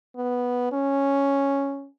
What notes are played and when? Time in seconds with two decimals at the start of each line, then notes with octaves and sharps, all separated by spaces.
0.16 B3
0.72 C#4